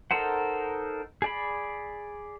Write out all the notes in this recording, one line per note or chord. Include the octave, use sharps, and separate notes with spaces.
D#4 A4 A#4 C5 F#5
G#4 D5 B5